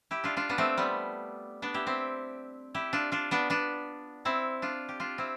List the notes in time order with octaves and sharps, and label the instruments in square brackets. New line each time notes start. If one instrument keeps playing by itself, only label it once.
[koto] E4 G4
D4 F4
D4 F4
B3 D4
A3 C4
G3 B3
B3 D4
E4 G4
C4 E4
E4 G4
D4 F4
D4 F4
B3 D4
B3 D4
C4 E4
D4 F4
G4
D4 F4
C4 E4